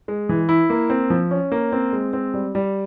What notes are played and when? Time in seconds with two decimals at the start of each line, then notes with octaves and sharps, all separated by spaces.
0.08 G#3
0.29 E3
0.49 E4
0.70 A#3
0.90 C4
1.10 F3
1.31 C#4
1.52 A#3
1.72 C4
1.93 G#3
2.13 C4
2.34 G3
2.55 G3